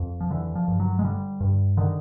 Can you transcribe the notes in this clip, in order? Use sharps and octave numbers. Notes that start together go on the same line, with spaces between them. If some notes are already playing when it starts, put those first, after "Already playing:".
Already playing: F2
F3
D3 E3
F3
G2
F#3
G#3
D3 G3
G2
D3 D#3